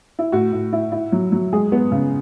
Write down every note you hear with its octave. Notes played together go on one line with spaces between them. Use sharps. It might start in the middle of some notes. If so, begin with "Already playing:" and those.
E4
A2 F#4
A2
E4
E4
F#3
F#3
G#3 G#4
B3
C#3